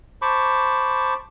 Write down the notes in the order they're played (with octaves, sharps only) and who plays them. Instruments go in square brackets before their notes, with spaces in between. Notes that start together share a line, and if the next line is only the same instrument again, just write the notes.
[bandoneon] C5 A5 B5 C#6 D6